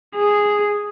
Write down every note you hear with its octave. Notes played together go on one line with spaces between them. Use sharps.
G#4